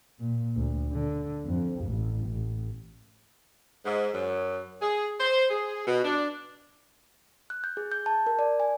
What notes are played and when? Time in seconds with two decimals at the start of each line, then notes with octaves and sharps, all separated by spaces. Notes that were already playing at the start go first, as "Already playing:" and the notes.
0.20 A#2
0.56 D2
0.91 D3
1.46 F2
1.86 A1
2.27 A1
3.85 G#2
4.14 F#2
4.81 G#4
5.20 C5
5.50 G#4
5.86 B2
6.04 D4
7.50 F#6
7.64 G6
7.77 G#4
7.92 G6
8.06 A5
8.27 A#4
8.39 D5
8.60 G#5